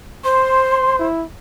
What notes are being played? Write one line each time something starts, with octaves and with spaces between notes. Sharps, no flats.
C5 C6
E4